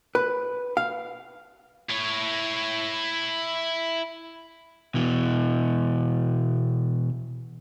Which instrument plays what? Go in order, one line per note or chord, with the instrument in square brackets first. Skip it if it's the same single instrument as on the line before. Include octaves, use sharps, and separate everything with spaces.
[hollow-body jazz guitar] B4
F5
[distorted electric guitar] E4 C#5
[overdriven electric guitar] B2 E3